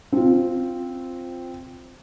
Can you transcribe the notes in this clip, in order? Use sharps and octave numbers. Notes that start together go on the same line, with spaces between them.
C4 F4